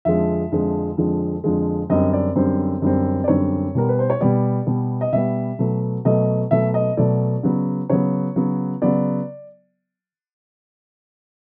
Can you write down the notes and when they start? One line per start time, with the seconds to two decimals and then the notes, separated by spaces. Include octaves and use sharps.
0.05 F2 D3 F3 G#3 E5
0.52 F2 D3 F3 G#3
0.97 F2 D3 F3 G#3
1.44 F2 D3 F3 G#3
1.90 F#2 D3 G3 C4 D#5
2.13 D5
2.36 F#2 D3 G3 C4 C5
2.82 F#2 D3 G3 C4
3.24 D5
3.28 F#2 D3 G3 C4 C#5
3.75 B2 G3 B3 A#4
3.89 B4
3.99 C5
4.10 C#5
4.21 B2 G3 B3 D5
4.67 B2 G3 B3
5.01 D#5
5.13 B2 G3 B3 E5
5.59 B2 F#3 A3
6.05 B2 F#3 A3 D#5
6.51 B2 F#3 A3 E5
6.74 D#5
6.97 B2 F#3 A3 D5
7.43 C#3 F#3 B3
7.89 C#3 F#3 B3 C#5
8.36 C#3 F#3 B3
8.82 C#3 F#3 B3 D5